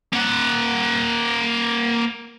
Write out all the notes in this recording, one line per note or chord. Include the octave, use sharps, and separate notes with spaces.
A#3 F#5